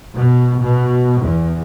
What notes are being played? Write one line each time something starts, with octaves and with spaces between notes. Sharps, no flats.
B2
B2
E2